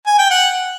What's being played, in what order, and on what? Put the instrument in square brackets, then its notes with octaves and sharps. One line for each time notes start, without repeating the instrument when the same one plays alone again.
[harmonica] G#5
G5
F#5